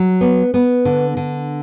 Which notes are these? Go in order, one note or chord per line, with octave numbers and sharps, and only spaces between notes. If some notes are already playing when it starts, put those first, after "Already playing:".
Already playing: F#3
B3
B3
D3
D3